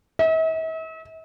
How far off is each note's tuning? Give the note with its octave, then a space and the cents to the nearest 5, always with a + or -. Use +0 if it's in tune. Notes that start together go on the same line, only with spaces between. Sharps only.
E5 -45